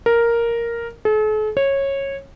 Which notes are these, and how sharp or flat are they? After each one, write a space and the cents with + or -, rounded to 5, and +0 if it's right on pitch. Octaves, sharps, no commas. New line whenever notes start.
A#4 +0
A4 -45
C#5 -15